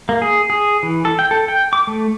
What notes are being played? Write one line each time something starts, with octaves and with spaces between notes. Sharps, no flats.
A#3
G#4
G#4
E3
A4
G5
A4
G5
D6
A3